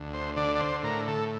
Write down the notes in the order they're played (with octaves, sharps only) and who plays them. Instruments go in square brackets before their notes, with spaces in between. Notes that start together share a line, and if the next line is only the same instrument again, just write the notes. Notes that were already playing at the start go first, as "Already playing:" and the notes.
Already playing: [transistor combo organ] D2
C5
D3 D5
D5
C5
A2 A#4
A4